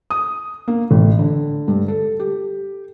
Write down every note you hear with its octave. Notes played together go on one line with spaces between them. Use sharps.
D#6
A#3
A1
D3
G2
A4
G4